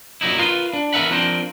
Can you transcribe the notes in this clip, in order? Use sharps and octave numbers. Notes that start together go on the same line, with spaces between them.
F#2 A#2 F#3 D#4 E4
F4 A#4 B4 C6
D4
E2 A#4 E5 F#5 B5
F3 C4 D4 A#4 C5